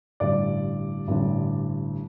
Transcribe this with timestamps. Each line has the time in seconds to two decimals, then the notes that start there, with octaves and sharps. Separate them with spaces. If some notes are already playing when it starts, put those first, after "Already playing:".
0.20 A1 G2 D3 D5
1.08 A1 G2 D3